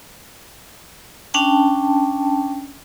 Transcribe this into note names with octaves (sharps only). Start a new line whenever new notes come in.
C#4 D4 G5 A5